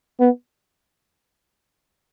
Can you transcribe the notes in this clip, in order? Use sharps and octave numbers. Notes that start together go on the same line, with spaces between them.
B3